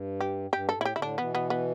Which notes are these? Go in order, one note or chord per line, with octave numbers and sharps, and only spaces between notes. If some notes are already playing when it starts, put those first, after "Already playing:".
Already playing: G2
G4
G2 G4
A4
A2
E4
G4
A2 D3 E4
D4
B2 E3 B3
B3
B3